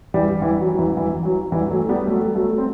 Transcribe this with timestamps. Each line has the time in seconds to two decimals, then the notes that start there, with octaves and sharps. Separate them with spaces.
0.14 E3 G3
0.42 E3
0.60 F#3
0.71 F#3
0.79 E3
0.97 E3
1.25 F#3
1.52 E3 G3
1.70 F#3 A3
1.89 G3 B3
2.07 F#3 A3
2.35 F#3 A3
2.58 C4